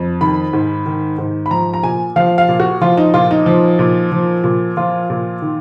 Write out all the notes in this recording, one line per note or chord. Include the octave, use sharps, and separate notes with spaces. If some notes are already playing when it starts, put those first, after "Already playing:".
Already playing: F2
D#3 B5
G#2
D#3
G#2
B5
F3 A#5
A#5
A#2 G#5
F3 F5
F5
A#2
F#4
F3 F4
D#4
A#2 F4
D#4
F3
A#2
F3
A#2
F3 F4
A#2
D#3